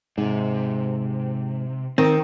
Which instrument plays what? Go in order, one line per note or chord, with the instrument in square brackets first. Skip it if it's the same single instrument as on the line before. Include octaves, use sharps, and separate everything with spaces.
[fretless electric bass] G#2 [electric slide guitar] C3
[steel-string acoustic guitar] D#3 [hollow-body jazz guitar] C4